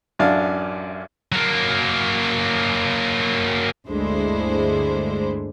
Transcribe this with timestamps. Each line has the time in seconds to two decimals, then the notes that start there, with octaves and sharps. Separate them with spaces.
0.19 A1 F#2 D4 F5
1.32 F#3 A#3
3.87 G1 D2 D3 G#3 E4 C5